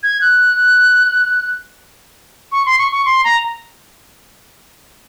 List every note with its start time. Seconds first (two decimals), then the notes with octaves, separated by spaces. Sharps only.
0.03 G#6
0.21 F#6
2.52 C#6
2.66 C6
2.79 C#6
2.92 C#6
3.05 C6
3.24 A#5